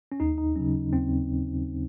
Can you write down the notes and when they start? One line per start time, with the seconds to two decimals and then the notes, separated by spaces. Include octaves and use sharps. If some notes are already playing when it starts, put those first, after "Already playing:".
0.12 C#4
0.20 D#2 D#4
0.38 D#4
0.56 C#3 F#3 C#4
0.93 D#2 C4